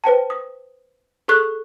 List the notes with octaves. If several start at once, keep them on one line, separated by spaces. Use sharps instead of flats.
B4 C5 G5 A5
D#6
G#4 A4 C#6 F#6